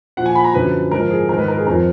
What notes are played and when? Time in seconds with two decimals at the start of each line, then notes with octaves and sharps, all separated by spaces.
0.17 A#2 F3 F#5
0.26 G#5
0.35 B5
0.44 A#5
0.54 F#2 D3 F3 B4
0.91 G#2 F3 A#4
1.10 G#4
1.29 D#3 A#4
1.33 G#2
1.39 B4
1.48 A#4
1.57 G#4
1.67 F2 F3 A#4